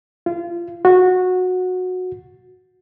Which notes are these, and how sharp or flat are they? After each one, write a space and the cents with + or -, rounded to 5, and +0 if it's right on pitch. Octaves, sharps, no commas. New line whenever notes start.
F4 -25
F#4 -15